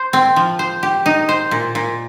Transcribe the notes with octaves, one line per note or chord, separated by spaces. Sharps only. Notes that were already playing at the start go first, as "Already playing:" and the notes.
Already playing: C5
C4
F3
C5
G4
D#4
C5
A#2
A#2